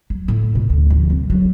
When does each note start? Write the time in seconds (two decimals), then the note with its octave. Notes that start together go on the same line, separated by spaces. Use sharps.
0.10 F#3
0.28 A2
0.55 B2
0.70 D2
0.90 F3
1.10 C2
1.30 F#3